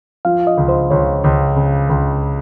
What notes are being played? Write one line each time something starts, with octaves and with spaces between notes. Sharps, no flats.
F3 F5
D#5
C#2
C5
C#2 C#5
C#2
C#3
C#2